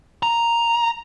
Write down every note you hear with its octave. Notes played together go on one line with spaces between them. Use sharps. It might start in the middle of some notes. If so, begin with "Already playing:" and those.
A#5